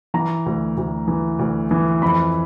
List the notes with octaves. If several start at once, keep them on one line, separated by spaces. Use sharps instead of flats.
E3 A#5
D2
D2
E3
D2
E3
F2 B5